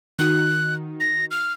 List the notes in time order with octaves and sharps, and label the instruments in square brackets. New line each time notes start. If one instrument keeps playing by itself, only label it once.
[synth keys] D#3 D#4 F#4 [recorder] F#6
[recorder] A#6
F6